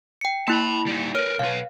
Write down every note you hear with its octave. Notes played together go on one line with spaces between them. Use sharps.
G5 C#7
A#3 E4 A5 B5
G3 D#4
A#4 B4 C#5 F6
B1 B4 F5